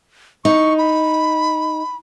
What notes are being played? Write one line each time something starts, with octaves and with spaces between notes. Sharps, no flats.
D#4 C#6
B5